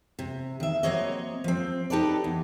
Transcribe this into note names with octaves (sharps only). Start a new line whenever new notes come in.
C3
D#3 E5
F#3 A#3 C4 C#5 D#5
F3 C4
D#4 G4 A4 B4 D5
E2